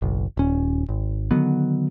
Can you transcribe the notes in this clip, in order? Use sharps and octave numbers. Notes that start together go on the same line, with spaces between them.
F#1 B1
D#1 C#4
G#1
D3 D#3 F#3 B3